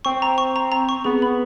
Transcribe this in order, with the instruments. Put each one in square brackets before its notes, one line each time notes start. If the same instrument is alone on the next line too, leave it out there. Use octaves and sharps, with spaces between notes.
[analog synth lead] C4 [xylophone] C#6
[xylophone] A#5
C#6
A#5
A#5
C#6
[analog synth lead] B3 [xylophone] G#4
[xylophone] B5